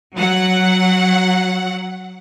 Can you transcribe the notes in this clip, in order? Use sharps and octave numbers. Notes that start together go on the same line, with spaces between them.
F#3 F#5